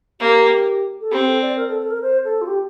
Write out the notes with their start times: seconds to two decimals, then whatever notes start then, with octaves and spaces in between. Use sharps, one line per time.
0.20 A#3 G4
1.01 A4
1.11 C4 G4
1.27 A4
1.42 D5
1.57 A#4
1.68 A4
1.79 A4
1.90 A#4
2.02 C5
2.25 A4
2.42 F4
2.47 G4